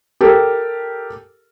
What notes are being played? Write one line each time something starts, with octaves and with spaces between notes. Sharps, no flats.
G4 A4 A#4